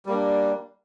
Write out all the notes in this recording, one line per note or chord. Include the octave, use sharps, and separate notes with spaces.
G3 A#3 D4